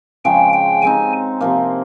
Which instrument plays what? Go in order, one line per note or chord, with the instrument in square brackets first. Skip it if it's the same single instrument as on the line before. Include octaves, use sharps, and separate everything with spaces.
[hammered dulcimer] C#3 F3 G#3 [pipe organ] G5
[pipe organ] G5
[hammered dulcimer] G#3 C4 D#4 [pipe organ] G#5
[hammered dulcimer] C3 F3 A#3